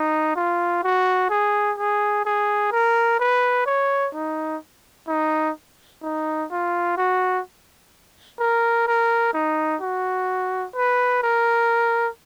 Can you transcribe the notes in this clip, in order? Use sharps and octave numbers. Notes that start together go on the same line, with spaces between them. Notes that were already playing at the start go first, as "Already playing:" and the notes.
Already playing: D#4
F4
F#4
G#4
G#4
G#4
A#4
B4
C#5
D#4
D#4
D#4
F4
F#4
A#4
A#4
D#4
F#4
B4
A#4